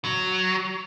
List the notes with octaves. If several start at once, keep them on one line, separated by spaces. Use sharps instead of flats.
F#3